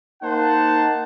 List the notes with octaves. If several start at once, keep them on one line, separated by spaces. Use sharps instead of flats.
A#3 D#4 C5 F#5 A5